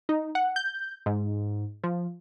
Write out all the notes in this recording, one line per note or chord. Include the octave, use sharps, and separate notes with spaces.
D#4
F#5
G6
G#2
F3